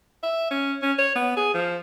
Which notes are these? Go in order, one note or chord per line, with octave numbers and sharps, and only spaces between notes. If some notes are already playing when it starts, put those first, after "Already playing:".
E5
C#4
C#4
C#5
B3
G#4
F3